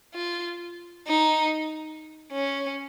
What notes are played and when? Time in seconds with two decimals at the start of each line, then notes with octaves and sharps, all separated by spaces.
0.14 F4
1.07 D#4
2.32 C#4